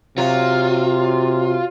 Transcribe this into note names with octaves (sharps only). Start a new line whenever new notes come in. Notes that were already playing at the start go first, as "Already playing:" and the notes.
C3 F#3 F4